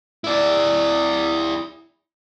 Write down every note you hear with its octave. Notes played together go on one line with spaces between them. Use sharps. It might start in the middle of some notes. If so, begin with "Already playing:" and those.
E4 D5